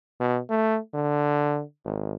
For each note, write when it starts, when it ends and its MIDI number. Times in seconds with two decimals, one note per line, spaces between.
0.21 0.39 47
0.50 0.78 57
0.95 1.62 50
1.85 2.14 32